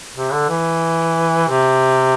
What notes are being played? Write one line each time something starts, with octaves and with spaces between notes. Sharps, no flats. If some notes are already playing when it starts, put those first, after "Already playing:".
C3
D3
E3
C3